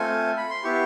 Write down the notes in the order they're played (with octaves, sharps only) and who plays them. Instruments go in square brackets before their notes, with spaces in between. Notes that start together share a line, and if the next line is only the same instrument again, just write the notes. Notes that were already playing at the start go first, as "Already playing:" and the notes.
Already playing: [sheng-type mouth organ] A3 C4 F4 A4 G#5
B5
C6
B3 E4 G4 C#6